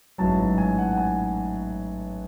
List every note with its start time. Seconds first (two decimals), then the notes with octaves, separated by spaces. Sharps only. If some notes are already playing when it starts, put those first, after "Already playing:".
0.18 A1 G#2 F#3 A5
0.58 G#5
0.78 F#5
0.98 G#5